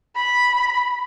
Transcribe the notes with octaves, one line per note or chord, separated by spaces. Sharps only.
B5